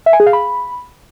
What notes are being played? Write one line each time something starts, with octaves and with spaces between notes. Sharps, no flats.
E5
G#5
G#4
F5
B5